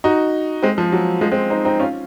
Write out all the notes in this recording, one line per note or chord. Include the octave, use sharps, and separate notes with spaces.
D#4 F#4
G#3 C4
F3
F#3
F3 G#3
G#3 C4
C4 D#4
C4 D#4
C#4 F4